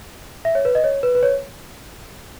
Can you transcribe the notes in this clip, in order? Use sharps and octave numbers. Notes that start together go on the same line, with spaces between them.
E5
C#5
B4
D#5
C#5
B4
B4
C#5